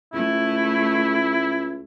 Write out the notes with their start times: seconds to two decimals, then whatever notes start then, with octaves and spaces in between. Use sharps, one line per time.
0.13 C#2 A3 E4